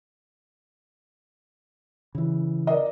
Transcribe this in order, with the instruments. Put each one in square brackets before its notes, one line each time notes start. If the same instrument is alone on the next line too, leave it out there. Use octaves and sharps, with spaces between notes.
[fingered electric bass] C#3 E3
[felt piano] A#4 D5 D#5